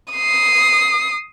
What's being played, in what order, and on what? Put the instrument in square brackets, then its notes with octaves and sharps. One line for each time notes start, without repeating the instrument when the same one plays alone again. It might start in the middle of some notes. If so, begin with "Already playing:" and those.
[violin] D#6 C7